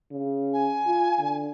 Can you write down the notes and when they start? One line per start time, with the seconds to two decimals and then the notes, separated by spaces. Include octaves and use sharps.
0.12 C#3
0.53 G#5
0.87 F4
1.19 D3